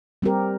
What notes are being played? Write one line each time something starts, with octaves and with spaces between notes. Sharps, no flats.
G3 C4 G4 A#4